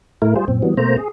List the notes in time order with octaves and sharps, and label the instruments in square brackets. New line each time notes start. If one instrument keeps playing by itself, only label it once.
[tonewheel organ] A2 A3 E4 A#4
G3 F4 G#4 C5
F#2 A#2 C4
E3 F#3 G3 B3
B2 A3 A#3 C4 C5 A#5
G#4